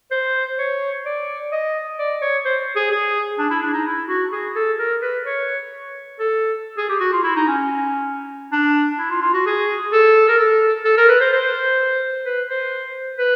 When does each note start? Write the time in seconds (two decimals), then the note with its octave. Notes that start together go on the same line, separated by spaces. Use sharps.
0.11 C5
0.59 C#5
1.05 D5
1.52 D#5
1.99 D5
2.22 C#5
2.45 C5
2.76 G#4
2.91 G#4
3.39 D4
3.50 E4
3.62 D4
3.74 D#4
3.86 E4
4.08 F#4
4.32 G#4
4.56 A4
4.79 A#4
5.02 B4
5.26 C#5
6.19 A4
6.78 G#4
6.89 G4
7.00 F#4
7.13 F4
7.24 E4
7.36 D#4
7.47 C#4
8.52 D4
8.99 E4
9.10 F4
9.22 F4
9.34 F#4
9.46 G#4
9.93 A4
10.28 A#4
10.39 A4
10.85 A4
10.97 A#4
11.09 B4
11.21 C5
11.33 C5
12.26 B4
12.49 C5
13.19 B4